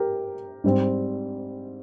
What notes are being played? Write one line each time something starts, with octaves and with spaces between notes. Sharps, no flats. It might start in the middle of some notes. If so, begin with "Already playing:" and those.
Already playing: G4 A#4
G#2 G3 C4